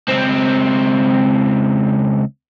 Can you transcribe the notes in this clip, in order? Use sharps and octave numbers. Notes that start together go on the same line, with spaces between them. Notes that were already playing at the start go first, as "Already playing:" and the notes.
C#2 C4